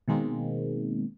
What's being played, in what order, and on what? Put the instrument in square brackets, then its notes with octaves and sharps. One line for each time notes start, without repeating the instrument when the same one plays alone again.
[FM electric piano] B2 D#3 G#3 A#3 C4